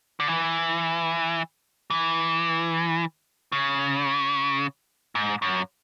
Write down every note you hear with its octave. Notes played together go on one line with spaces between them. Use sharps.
D3
E3
E3
C#3
G#2
F#2